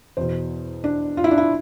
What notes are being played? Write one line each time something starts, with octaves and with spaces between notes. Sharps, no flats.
E2 B2 C5
D4
F4
E4
D4
E4